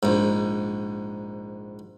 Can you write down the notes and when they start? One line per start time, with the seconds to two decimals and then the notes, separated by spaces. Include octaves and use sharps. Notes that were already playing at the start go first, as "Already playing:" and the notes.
0.03 A#1 G#2